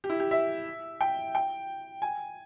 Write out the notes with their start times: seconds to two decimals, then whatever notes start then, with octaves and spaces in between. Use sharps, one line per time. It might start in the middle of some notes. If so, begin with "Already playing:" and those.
0.04 G4
0.09 E4
0.20 G4
0.31 E5
1.01 G5
1.35 G5
2.02 G#5